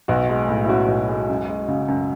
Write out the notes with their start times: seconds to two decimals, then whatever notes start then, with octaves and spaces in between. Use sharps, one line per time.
0.08 B1 F#4
0.29 G#3
0.48 A2
0.64 E4
0.68 C#4 F#4
0.88 B1
1.09 G#3
1.29 F#2
1.48 G#3
1.68 C#3
1.88 F#2